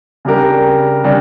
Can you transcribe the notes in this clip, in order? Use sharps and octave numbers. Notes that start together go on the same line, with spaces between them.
C#3 G3 D4 G4 A#4
C#3 G3 D4